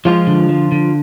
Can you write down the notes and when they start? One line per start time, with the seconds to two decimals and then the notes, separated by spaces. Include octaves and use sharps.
0.05 F3 G#3 F4
0.27 D3
0.49 F3
0.72 D3